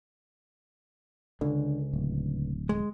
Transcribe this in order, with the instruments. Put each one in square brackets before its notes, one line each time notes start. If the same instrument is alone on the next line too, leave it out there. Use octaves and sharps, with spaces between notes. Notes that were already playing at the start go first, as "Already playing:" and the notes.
[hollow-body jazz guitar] C#2 [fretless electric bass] D3
[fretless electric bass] D1
[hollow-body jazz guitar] G#3